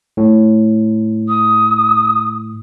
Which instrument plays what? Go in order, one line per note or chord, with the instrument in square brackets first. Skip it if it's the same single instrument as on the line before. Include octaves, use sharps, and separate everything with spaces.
[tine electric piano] A2
[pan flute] D#6